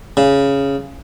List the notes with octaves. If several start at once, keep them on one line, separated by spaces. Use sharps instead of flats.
C#3